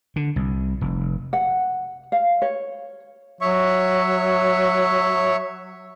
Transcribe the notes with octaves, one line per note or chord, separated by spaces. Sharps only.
D3
C2
F1
F#5
F5
C#5
F#3 C#5 E5 C#6